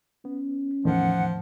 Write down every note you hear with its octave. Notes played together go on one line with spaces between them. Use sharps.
B3 C#4
E2 A2 D#3 F3 F#5